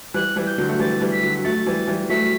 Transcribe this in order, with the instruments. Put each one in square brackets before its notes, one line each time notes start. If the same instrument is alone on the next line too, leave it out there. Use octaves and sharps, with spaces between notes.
[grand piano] E3 G3 [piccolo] F#6
[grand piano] E3 G3
[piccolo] G6
[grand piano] D3 F#3
A3
[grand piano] E3 G3 [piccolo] A6
[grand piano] E3 G3
[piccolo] B6
[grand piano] D3 F#3
[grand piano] F#3 A3 [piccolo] A6
[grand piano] E3 G3
E3 G3
[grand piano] F#3 A3 [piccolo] B6